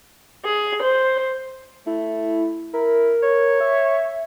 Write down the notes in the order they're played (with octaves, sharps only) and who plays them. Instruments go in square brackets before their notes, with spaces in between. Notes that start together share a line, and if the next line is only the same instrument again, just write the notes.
[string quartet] G#4
C5
[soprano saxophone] A3 [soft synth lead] E4
[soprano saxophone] E4 [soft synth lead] A#4
[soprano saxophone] C#5
[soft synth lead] E5